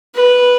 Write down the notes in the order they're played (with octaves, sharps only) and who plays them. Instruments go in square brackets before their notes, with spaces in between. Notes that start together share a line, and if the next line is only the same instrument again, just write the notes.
[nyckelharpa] B4